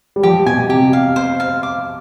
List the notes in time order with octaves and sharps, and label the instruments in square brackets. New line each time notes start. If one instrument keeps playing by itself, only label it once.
[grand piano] G3
[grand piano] F3 [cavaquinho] G4
[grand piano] B2 [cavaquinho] G#5
[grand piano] C3 [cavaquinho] G4
[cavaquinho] F5
C5
F5
D6